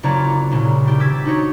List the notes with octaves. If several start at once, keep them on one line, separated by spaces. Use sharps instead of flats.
F#1 C4 F4 C#5 D5 A#5
C2 A#2 C#3
D#1 G4 A6
D6 E6 G#6 B6
D4 D#4 F#4 C#5